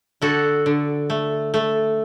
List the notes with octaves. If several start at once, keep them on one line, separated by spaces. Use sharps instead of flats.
D3 F#4 A4
D3
A3
A3